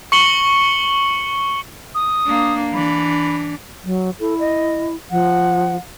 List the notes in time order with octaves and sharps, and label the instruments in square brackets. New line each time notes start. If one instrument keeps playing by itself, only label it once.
[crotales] C#6 C#7 F#7 G7
[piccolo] D#6
[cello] A#3 D4
[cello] E3 D4 [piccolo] B5
[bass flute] F#3
[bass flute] E4 [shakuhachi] A4
[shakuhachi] D#5
[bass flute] F3 [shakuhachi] F#5